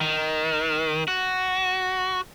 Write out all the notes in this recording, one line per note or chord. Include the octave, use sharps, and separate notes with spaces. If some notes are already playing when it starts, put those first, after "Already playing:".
D#3
F#4